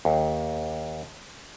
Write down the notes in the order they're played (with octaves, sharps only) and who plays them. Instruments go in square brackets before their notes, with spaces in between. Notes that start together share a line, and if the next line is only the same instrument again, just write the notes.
[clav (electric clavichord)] D#2